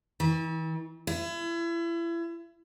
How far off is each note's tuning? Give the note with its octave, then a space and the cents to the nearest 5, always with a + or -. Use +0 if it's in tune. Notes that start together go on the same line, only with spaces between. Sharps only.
E3 -40
E4 +35